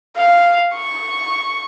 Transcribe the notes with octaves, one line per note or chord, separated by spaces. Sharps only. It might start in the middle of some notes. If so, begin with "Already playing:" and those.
F5
C#6